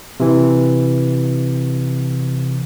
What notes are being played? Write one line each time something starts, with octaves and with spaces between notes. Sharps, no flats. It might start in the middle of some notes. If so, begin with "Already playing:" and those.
C3 E3